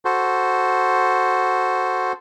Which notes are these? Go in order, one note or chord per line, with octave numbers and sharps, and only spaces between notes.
F#4 A4 C5